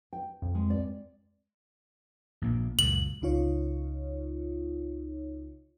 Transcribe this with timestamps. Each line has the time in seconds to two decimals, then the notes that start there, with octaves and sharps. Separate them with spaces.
0.13 G5
0.42 F2
0.55 G#3
0.70 D5
2.42 A#1 A#2 A#3
2.79 C#2 F#2 A#2 F#7
3.22 C#2 C#3 D#4 F4 C#5